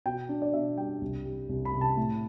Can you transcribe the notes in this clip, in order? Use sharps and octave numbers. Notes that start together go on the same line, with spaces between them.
B2 G5
D4
D5
B2 E5
G3 G5
C2
G3
C2
B5
C3
A5
A2